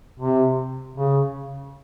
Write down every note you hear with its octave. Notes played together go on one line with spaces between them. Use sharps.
C3
C#3